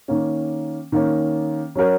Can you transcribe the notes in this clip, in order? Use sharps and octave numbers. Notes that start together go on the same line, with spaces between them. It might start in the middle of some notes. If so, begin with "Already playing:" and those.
D#3 A#3 C#4
D#3 A#3 C#4
F#3 C#4 F#4 A#4 C#5